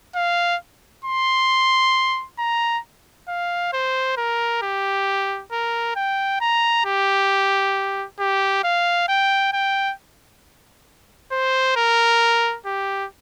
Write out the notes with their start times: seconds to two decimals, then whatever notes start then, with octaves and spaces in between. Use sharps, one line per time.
0.16 F5
1.05 C6
2.39 A#5
3.28 F5
3.73 C5
4.17 A#4
4.62 G4
5.52 A#4
5.96 G5
6.41 A#5
6.85 G4
8.20 G4
8.64 F5
9.09 G5
9.53 G5
11.32 C5
11.76 A#4
12.66 G4